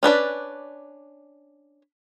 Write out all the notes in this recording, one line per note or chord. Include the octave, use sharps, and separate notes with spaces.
C#4 D4 B4 D5